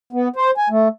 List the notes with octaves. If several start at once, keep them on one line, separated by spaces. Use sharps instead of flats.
B3
C5
G#5
A3